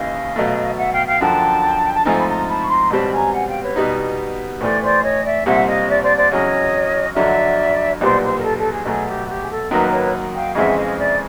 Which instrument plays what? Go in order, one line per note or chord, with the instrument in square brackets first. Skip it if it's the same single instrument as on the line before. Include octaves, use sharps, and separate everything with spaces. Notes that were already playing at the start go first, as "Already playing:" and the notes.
Already playing: [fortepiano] D#2 C#3 E3 [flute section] D#5 F5
[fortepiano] B2 F#3 A3
[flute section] E5 F#5
F5 G5
F5 G5
[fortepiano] F#2 D3 F3 [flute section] G5 A5
[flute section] A5
[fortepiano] G#2 F3 A3 C4 D#4 [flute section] G#5 A#5
[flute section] B5
A#5 C6
A5 B5
C#6
A#5 C6
[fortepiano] C#2 B2 G3 C4 [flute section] A5 B5
[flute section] G#5 A#5
F#5 G#5
F5 G5
B4 C#5
[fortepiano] B2 G3 B3 D#4
[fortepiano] A2 E3 A3 [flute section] C5 D5
[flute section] C5 D5
C#5 D#5
D5 E5
[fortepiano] C2 A#2 G3 C4 [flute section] E5 F#5
[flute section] D#5 F5
D5 E5
C5 D5
C5 D5
[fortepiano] E2 C#3 F#3 [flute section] C#5 D#5
[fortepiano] F2 D3 F#3 [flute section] D5 E5
[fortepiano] B1 A#2 G3 B3 [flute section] C5 D5
[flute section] C5
A#4
A4
A4
G#4
[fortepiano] B2 F#3 A3 [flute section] G#4
[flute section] G4
F#4
G4
G#4
A4
[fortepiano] F#2 D#3 F#3 A#3 D#4 [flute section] B4
[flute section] B4 C#5
F5 G5
[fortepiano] F2 C#3 E3 G#3 C4 [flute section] E5 F#5
[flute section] D#5 F5
D5 E5